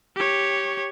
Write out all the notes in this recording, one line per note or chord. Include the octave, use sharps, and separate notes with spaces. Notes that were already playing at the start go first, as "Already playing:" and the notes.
G4 C#5